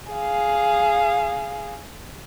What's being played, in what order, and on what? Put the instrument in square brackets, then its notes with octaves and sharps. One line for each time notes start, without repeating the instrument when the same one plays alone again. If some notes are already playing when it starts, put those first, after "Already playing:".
[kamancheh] G#4 F5